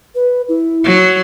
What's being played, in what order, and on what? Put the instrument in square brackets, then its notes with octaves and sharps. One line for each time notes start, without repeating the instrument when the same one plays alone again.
[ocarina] B4
E4
[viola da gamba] F#3